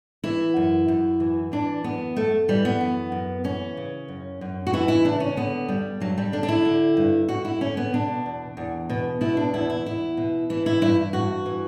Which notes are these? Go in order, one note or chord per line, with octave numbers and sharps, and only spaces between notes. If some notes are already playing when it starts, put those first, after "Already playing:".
E3 E4
F#2
F#2
E3
E3 D4
F#2 B3
F#2 A3
E3 G3
B3
F#2
F#2
E3 C#4
C#3
F#2
F#2
F#4
E3 E4
E4
C#3 D4
C#4
D3 B3
G2 G3
G2 F#3
G3
D3 D4
D4
E4
D3
G2
G2 F#4
E4
D3 C#4
B3
B2 D4
E2
E2
B2
B2 E4
D4
E2 E4
E4
E2 E4
B2
E3 E4
E4
G2 E4
G2 F#4
E3